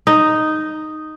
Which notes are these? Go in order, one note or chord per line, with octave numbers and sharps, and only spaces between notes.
D#4